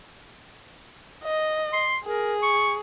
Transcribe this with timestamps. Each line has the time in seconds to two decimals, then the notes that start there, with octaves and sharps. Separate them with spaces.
1.24 D#5
1.73 C6
2.05 G#4 A#4
2.42 C#6